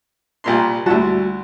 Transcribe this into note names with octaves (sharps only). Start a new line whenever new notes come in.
C2 A#2 C6
D2 G3 E4 F#4 A5